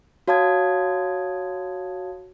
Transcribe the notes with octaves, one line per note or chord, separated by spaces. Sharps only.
F#4 C#5 F5 A5 D#6 G#6